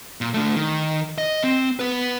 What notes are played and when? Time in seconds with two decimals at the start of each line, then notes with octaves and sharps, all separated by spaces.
0.21 A#2
0.34 A3 D4
0.56 D#3
1.18 D#5
1.44 C4
1.80 B4 F#5